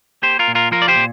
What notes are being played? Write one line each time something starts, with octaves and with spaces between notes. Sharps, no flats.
A#3 G4 C5
F4 A#4
A#2
F4 A#4
F3 F4 A#4
D5
G4 C5
A#2